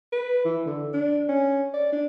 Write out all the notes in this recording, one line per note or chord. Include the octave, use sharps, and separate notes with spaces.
B4
E3
D3
D4
C#4
D5
D4